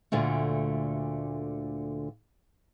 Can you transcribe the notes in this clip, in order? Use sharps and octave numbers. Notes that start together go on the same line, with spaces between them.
D2 A#2 D3 A3